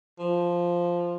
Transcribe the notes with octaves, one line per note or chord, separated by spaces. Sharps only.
F3